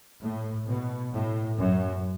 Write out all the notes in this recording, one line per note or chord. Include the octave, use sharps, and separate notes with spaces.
A2
B2
A2
F#2